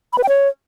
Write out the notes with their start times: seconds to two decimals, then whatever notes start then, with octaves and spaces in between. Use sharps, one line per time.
0.13 B5
0.18 B4
0.23 G5
0.29 C#5